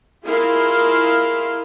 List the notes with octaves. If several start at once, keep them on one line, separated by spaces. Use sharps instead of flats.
E4 F4 G#4 A#4 F5 C6